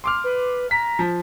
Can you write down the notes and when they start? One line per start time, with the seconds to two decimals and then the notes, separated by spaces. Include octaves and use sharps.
0.04 C6 D6 F6
0.24 B4
0.71 A#5 B6
0.99 F3